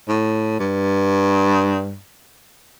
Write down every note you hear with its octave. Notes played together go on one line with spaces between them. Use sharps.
A2
G2